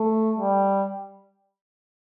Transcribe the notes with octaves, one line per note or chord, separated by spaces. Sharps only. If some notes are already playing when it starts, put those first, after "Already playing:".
Already playing: A3
G3